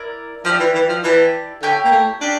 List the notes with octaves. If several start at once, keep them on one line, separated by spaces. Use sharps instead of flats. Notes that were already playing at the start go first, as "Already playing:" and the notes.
Already playing: E4 A#4 D5
F3 E4 G4 D5
E3
E3
F3
E3 E4 G4 D5 A5
D3 E4 G4 C#5 G5
A#3
A3
C#4 D4 G4